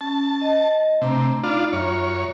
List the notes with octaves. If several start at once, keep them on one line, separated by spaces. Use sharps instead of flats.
C#4 A5
D#5
C3 A3 D4 A#5
D4 D#4 F4 B5
F#2 F4 C#5 E5 A#5